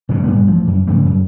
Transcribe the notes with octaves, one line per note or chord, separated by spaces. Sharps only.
F1 G2 C#3
G2 A#2 G3 B3
A1 F3
F#2
G#2 C#3 F3 A3
F#2